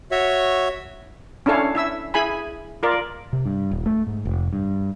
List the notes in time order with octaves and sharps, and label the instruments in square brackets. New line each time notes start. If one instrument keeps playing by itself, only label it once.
[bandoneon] F#4 C#5 E5
[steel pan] C#4 D4 E4 A4 C#5 F5
E4 E5 E6
E4 G#4 G#5 B5
F4 A#4 D5
[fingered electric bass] C3
G2
D#1
A3
G#2
F1
G2